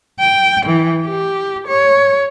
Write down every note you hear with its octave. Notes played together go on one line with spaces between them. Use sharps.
G5
E3
G4
C#5